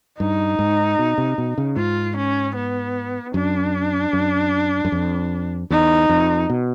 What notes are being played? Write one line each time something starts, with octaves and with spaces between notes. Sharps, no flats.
G2 D#4
G#2
B2
C3
B2
C#3
G#2 F4
C#4
B3
F#2 D4
F#2
F#2
F2
E2 D#4
F2
B2